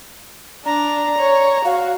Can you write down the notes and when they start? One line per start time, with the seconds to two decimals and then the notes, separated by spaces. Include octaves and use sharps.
0.66 D4 A#5
1.19 C#5
1.65 F#4 F5